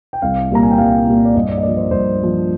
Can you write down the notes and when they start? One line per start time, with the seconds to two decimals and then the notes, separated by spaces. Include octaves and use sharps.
0.13 G5
0.22 C2 F5
0.51 A#2 G3 A#3 A#5
0.63 G#5
0.71 G5
0.78 C2 F5
1.07 A#2 G3 A#3
1.25 D5
1.35 G2 D#5
1.49 D5
1.58 D#5
1.63 F3 A#3 D5
1.77 C5
1.91 G2 C5
2.19 F3 A#3